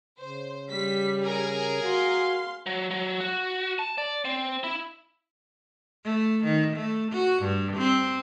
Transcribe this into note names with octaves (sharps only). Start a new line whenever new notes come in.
C#3 C5
G3 B6
G#4 A#4 G#5
F#4 F5 C6
F#3
F#3
F#4
A5
D5
C4
E4
A3
D#3
A3
F#4
G2
C4